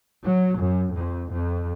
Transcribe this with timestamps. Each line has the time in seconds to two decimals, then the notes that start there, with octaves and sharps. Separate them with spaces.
0.24 F#3
0.57 F#2
0.93 F2
1.33 F2